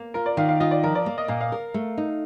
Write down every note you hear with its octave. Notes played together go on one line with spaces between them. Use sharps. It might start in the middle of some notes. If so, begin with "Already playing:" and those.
Already playing: A#3
F4 A#4
D5
D#3 F5
F5
F4 D#5
D5
F3 A#4
D5
A#3
D#5
A#2 F5
F5
A#4
A3
D#4